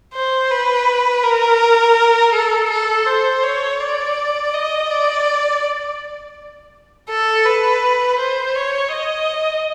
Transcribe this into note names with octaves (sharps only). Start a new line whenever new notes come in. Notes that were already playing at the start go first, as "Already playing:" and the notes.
C5
B4
A#4
A4
A4
C5
C#5
D5
D#5
D5
A4
B4
C5
C#5
D#5